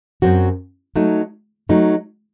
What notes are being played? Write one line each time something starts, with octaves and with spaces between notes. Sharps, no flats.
F#2 F#3 C4 F#4
F#3 A3 D#4
F#3 A3 D#4